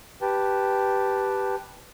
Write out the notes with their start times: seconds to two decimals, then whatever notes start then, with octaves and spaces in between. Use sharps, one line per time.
0.22 G4 B4 G5 A5